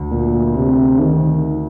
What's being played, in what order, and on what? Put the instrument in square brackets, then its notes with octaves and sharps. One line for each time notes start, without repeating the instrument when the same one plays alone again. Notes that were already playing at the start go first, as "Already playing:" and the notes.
Already playing: [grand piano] D2
[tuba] A#2
C3
D#3